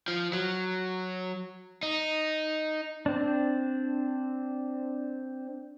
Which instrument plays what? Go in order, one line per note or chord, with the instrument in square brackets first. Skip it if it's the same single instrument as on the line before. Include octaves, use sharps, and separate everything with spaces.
[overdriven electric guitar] F3
F#3
D#4
[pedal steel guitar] C4 D4